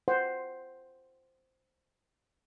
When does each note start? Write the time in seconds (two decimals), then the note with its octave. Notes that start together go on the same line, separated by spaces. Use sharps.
0.08 C5 F#5